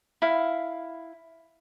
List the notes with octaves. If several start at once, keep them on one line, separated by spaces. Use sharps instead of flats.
E4 F5